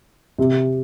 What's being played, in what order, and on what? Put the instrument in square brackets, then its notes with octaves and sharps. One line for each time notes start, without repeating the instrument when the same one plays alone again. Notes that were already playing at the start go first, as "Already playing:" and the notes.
[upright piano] C3